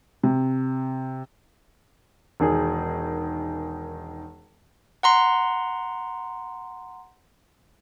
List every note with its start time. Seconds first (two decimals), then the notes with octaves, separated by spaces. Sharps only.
0.23 C3
2.40 E1 D#3 G#4
5.03 F#5 A#5 C6